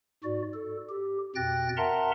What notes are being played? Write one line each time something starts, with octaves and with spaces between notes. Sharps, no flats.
G#2 F#4 D5
A4
G4
F2 B2 G5 F#6 A6 A#6
A#4 E5 F#5 A5 A#5 C6